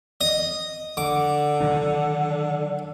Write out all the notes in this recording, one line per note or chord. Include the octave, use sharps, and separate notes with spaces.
D#5
D3 D6
D#3 F#3 D4